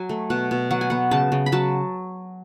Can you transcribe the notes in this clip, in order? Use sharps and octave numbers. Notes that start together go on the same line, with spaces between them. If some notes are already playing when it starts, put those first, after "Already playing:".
Already playing: F#3 G#5
A3
B2 F#5
B2
F#3 F#5
G#5
B3 F#5
C#3 A5
C#3
B5
F#3 A5